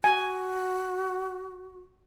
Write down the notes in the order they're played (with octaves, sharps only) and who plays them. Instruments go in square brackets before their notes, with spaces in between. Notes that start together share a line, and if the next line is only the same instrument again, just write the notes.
[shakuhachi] F#4 [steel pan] G#5